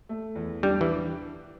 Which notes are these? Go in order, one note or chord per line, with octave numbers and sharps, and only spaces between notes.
A3
E2
G3 D4
E3